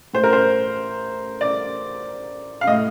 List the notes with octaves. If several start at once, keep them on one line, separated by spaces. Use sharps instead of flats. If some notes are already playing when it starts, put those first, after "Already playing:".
A2 C5
A#4
C5
D5
F5
A2 D#5